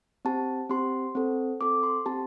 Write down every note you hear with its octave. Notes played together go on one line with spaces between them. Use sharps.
C4 G4 A5
C4 G4 C6
C4 A4
C4 A4 D6
C6
C4 G4 A5